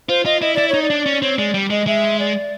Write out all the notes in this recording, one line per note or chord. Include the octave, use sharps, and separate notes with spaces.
F4 C5
F4 D#5
E4 D#5
E4 D5
D#4 C#5
D5
D4
C#4
C4 C#5
G#3 D5
G3
G#3 D#5
G#3 E5
D5